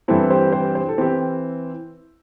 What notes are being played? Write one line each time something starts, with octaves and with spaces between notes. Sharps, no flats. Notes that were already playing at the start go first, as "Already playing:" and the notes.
G2 E3 C4 E4 A4
G4 C5
G4 C5
C5
A4
E3 C4 G4